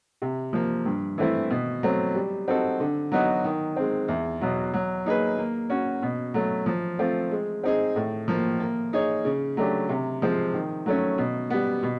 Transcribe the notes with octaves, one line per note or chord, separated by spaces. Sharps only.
C3
F3 A#3
G2
E3 A3 C4 E4
B2
F#3 A3 C4
G3
C4 D#4 F#4 A4
D3
F#3 B3 D#4 F#4
D#3
G#3 C4
E2
B2 F#3
F#3
A#3 D#4 G#4 B4
A#3
C#4 F#4
B2
F#3 A3
F3
A3 C4 F4
G#3
C4 D#4 G#4
A2
F3 A#3
A#3
D#4 G#4 C#5
C#3
F#3 A3 D4 G4
C3
F3 G#3 C4
D#3
F#3 A3 C#4
B2
G3 B3
B2